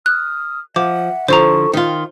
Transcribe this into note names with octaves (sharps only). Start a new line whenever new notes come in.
D#6 F6 F#6
F3 E5 F#5 D6
D3 F3 E4 A4 C5 A#5 C#6
D#3 F4 G5